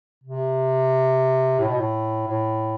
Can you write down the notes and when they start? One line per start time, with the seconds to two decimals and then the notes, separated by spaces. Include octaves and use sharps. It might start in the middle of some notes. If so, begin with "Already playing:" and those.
0.24 C3
1.59 A2
1.68 B2
1.78 A2
2.27 A2